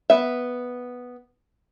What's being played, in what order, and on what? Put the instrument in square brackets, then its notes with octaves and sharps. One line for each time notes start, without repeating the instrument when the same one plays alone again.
[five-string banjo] B3 E5